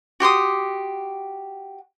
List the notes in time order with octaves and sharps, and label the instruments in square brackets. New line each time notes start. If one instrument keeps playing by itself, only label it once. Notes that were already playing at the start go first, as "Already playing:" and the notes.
[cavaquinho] F#4 G4 C6 D#6